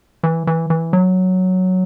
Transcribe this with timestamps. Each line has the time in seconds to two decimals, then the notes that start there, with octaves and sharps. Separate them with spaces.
0.23 E3
0.47 E3
0.70 E3
0.93 F#3